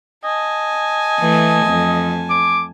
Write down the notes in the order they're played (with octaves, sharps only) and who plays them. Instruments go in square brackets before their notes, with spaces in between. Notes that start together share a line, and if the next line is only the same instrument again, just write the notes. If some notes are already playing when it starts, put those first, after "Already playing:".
[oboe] D#5 [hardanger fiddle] G#5 A5
[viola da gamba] E3 A3
F2
[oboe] D6